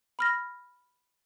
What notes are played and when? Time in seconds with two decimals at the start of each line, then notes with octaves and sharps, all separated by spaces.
0.19 B5 F6 A#6